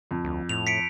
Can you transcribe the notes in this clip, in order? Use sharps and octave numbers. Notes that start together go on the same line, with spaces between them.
F2
D2
A2 F7
B6 C#7 D7